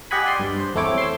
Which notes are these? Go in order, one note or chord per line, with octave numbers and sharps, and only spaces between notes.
G4 D#5 F#5 G#5 B5
D5 C6
G2
C5
E2 A3 C4 E4 C#5 D6
C6 E6